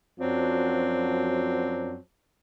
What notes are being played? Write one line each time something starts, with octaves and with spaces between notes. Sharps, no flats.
F#2 F3 F#3 C4 D4